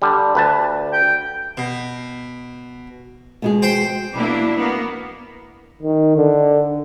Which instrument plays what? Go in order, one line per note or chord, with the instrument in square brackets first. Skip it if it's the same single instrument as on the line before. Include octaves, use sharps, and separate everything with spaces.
[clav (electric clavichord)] D3 G3
D2 B4 A5
[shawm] G5
[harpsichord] B2
[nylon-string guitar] B2 G#3 G#4
[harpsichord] C5 G5
[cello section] B2 A#3 D4 E4
A#3 B3
[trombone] D#3
D3